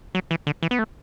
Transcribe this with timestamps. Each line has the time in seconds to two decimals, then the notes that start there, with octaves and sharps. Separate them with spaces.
0.15 F#3
0.31 E3
0.47 D3
0.63 E3
0.71 B3
0.79 A3